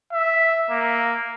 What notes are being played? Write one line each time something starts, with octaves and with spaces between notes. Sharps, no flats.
E5
A#3